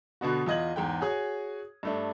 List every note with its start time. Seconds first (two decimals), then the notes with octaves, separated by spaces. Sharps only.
0.21 B2 D3 B3 F#4
0.46 E2 F4 D#5 G#6 F#7
0.76 E2 G#2 G5
1.01 F#4 G#4 C#5 G#5
1.83 G2 A3 D4